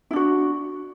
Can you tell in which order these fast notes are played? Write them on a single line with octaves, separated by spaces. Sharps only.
E4 D4 F#4